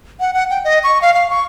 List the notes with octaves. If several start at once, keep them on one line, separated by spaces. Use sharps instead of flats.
F#5
F#5
G5
D#5
C#6
F5
F5
C#6